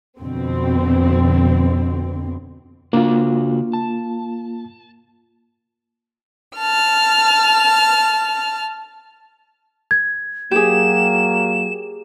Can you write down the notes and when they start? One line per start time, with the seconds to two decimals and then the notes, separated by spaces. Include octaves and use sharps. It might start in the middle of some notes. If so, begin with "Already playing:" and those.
0.20 F2 B2 D3 C4
2.93 C#3 A#3 D4 F4 F#4
3.73 A5
6.57 A5 F6
9.91 G#6
10.51 F#3 A#3 G4 G#4 E7